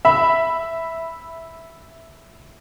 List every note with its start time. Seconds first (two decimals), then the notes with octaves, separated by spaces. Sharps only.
0.05 E5 B5